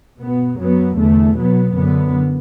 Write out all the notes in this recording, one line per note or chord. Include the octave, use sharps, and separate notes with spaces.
B2 B3
F#2 F#3 B3
E2 D3 A3
B2 F#3 B3
F#2 D3 B3